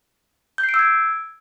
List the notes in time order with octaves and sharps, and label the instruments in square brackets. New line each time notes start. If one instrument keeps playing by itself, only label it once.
[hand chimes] G6
C7
D7
E6
G#6